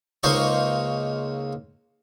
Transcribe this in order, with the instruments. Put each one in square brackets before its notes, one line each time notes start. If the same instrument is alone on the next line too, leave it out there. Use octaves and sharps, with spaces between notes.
[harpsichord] C#2 A#3 D#4 C5 C#6